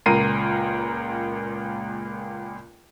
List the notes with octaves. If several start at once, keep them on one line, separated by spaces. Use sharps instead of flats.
C#2 A#2 A#4 A#5 C7 D#7